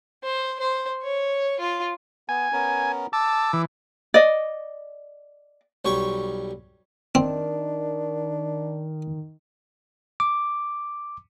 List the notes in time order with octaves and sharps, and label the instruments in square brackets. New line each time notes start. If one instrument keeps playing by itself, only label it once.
[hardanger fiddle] C5
C5
C#5
F4
[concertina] B3 [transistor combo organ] G#5
[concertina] B3 C#4 A#4
[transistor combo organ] A5 [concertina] D6 E6
[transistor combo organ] E3
[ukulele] D5 D#5
[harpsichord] B1 G3 C#5 G5 C#6
[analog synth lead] D#3 [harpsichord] C4 [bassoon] D4
[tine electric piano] D6